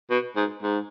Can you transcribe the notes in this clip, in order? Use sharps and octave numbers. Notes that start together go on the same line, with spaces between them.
B2
G#2
G#2